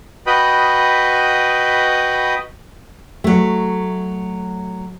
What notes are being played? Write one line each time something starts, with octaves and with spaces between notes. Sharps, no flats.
F#4 B4 D#5 G5 B5 D#6
F#3 A3